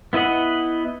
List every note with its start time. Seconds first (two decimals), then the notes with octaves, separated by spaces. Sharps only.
0.13 B3 E4 B4 D#5 F#5